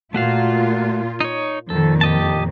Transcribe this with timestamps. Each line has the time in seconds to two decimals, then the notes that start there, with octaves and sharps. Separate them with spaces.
0.14 A#2 A3 F4 F#4 F5
1.21 D#4 C#5
1.70 F2 A#2 D#3 A4
2.01 G4 D#5 A5